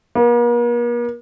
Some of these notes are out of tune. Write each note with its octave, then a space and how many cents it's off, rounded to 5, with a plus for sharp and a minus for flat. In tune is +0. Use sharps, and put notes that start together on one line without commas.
A#3 +45